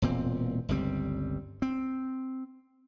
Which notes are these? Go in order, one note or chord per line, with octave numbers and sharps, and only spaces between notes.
E1 A#2 C4
G1 C#2 G3 C4
C4